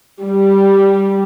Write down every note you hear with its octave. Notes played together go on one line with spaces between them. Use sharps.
G3